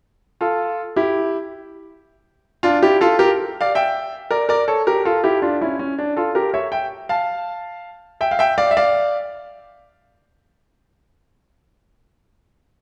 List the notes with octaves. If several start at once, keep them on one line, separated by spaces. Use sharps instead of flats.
F4 A4
E4 G4
D4 F4
E4 G4
F4 A4
G4 A#4
D5 F5
E5 G5
A#4 D5
A#4 D5
A4 C#5
G4 A#4
F4 A4
E4 G4
D4 F4
C#4 E4
C#4
D4
F4 A4
G4 A#4
C#5 E5
E5 G5
F5 A5
E5 G5
F5
E5 G5
D5 F5
E5
D5 F5